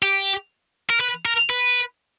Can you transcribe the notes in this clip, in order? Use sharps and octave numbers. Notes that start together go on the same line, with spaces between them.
G4
A#4
B4
A#4
B4